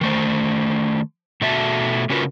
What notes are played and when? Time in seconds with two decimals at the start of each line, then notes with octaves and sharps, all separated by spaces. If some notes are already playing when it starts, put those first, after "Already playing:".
0.01 D#3 A3 C5
1.41 B2 A3 F#4 E5 A5
2.10 C#3 C#4 F4 F#4 A#4 B4